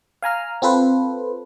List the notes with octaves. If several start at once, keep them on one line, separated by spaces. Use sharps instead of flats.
F5 G#5 A#5 F6
C4 F4 A4 B4 C5